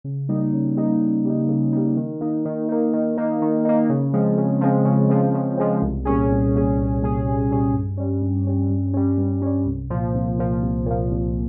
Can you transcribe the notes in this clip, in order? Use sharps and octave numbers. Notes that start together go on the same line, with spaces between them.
C#3
G3 A#3 D#4
C#3
G3 A#3 D#4
C#3
G3 A#3 D#4
C#3
G3 A#3 D#4
D#3
A#3 D#4
D#3
A#3 D#4
D#3
A#3 D#4
D#3
A#3 D#4
C#3
F3 G#3 C4
C#3
F3 G#3 C4
C#3
F3 G#3 C4
C#3
F3 G#3 C4
C2
A#2 G3 C#4 G#4
C2
A#2 G3 C#4 G#4
C2
A#2 G3 C#4 G#4
C2
A#2 G3 C#4 G#4
G2
G3 C#4
G2
G3 C#4
G2
G3 C#4
G2
G3 C#4
C2
A#2 F3
C2
A#2 F3
C2
A#2 F3
C2